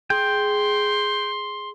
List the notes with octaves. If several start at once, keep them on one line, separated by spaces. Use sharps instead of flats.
G#4 G5 C6